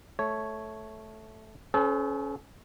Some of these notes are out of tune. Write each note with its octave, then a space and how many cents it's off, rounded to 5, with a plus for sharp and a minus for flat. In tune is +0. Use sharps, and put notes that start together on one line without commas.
A3 -10 C#5 +0
C#4 +0 A4 -45 C5 -40